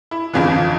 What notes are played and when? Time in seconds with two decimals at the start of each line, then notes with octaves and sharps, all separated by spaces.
0.11 E4
0.34 G1 F2 C#3 E3 F4
0.54 F4